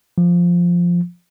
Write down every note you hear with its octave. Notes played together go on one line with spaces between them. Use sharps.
F3